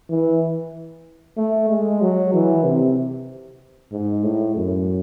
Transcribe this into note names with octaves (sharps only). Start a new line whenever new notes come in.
E3
A3
G#3
F#3
E3
C3
G#2
A2
F#2